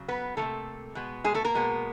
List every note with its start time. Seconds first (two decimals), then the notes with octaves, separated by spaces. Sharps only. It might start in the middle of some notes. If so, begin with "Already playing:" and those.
Already playing: C#3 F#3
0.08 B3 B4
0.37 F3 A3 A#3 A4
0.42 C3
0.95 B2 G#3 B3
1.24 G#3 G#4
1.34 A3 A4
1.44 A#3 A#4
1.55 B2 G#3 B3